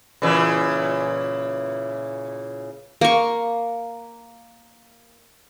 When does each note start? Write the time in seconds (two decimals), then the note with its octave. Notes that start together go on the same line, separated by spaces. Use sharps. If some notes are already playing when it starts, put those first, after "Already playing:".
0.22 A#2 C#3 E3
3.01 A#3 C#6